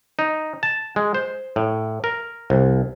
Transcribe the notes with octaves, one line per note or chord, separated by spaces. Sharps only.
D#4
A5
G#3
C5
A2
A#4
C2